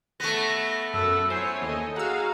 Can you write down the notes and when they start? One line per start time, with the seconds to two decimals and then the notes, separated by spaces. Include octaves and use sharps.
0.20 A3 B3 A#6
0.94 F#2 A4 F#5 E6
1.30 E4 C5 C#5 G#5
1.62 D#2 A4 D#5
1.96 F#4 G#4 F5 F#5 A#5 E6